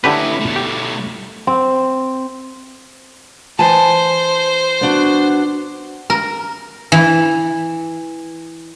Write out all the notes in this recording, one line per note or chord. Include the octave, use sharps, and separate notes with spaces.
D3 C#4 E4 G4 B4
B2 A3
G4
C4
E3 C5 G#5 A5
B3 D4 F#4
A#4
E3